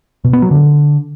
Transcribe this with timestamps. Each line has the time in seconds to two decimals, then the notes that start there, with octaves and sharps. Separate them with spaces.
0.25 B2
0.33 B3
0.42 F#3
0.51 D3